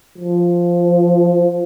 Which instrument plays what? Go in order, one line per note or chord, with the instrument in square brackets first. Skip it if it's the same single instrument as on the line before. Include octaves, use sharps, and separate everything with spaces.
[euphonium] F3